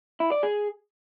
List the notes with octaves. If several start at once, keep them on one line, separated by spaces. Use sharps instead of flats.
E4
D5
G#4